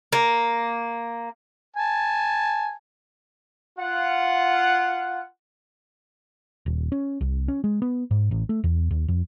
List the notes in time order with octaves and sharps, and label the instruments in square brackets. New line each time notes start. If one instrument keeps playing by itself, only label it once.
[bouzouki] A#3
[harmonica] G#5 A5
[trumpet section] F4 F#5
[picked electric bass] D#1
C#4
C2
C#4
G#3
B3
G#2
A1
A3
E2
D#2
F2